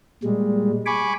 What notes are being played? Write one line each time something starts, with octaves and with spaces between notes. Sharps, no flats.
A#2 G3 G#3
G#5 B5 C#6 D6